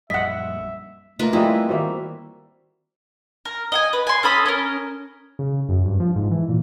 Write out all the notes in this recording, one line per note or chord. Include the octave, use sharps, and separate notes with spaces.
A#1 F#2 G3 D#5 E5 F#5 B6
A3 A#3 F4 B4 D#5 A#5
G3 C4 E4 F4 G#4 D#5 B5
D#3 G3 A#3 F#4 C5 E5
A#4
D#5 F#5 G#5
B4
G#5 C6
C#4 A4 B5 D#6
C#4 A#4
C#3
F#2
G2
F3
G#2
E3
A#2